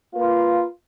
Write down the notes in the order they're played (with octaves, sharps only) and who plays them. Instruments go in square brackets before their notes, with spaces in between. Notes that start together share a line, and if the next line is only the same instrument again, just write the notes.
[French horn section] A#3 F4 B4